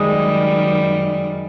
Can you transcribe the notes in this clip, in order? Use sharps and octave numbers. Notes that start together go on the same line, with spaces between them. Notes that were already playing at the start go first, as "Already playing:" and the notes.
Already playing: F#2 D#3 G3 G#3